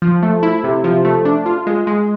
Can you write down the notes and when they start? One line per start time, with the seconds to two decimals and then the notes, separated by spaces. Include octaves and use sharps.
0.02 F3
0.23 A3
0.43 E4
0.64 C3
0.84 F3
1.05 A3
1.25 D4
1.46 F4
1.67 G#3
1.87 G#3